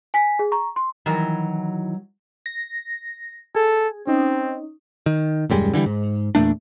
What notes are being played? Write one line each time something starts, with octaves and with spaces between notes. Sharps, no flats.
G#5 B6
G#4
A#5 C#6
C6
D#3 E3 F#3
A#6
G#4 A4
C4 C#4 D#4
D#3
D#1 F#2 G3 G#3
D3 E3 F#3 G3
G#2
E2 A#2 A3 D4